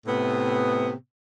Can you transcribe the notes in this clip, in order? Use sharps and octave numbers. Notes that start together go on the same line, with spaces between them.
A2 C3 B3